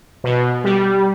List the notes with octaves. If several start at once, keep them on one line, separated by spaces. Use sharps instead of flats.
B2
G3